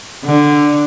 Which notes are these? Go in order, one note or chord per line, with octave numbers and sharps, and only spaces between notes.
D3